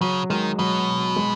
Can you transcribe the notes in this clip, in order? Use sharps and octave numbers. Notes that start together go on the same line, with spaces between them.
C#3 F#3
D#3 G#3
B2 F#3
G#3